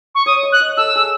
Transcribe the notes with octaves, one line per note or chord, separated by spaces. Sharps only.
C#6
C#5 D#6
D#5
F#6
D#5
A4 E6
G#4